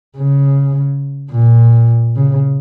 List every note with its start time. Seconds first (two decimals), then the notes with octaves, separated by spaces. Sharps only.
0.17 C#3
1.31 A#2
2.16 C#3